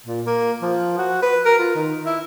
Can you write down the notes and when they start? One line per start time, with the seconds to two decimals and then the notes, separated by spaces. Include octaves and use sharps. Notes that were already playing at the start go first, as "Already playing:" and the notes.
0.06 A#2
0.26 A#3
0.62 F3
0.98 F#4
1.22 B4
1.46 A#4
1.59 F4
1.75 D#3
2.06 E4